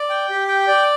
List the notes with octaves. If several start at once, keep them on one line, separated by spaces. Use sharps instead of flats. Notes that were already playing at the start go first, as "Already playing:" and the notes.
Already playing: D5
G5
G4
G5
D5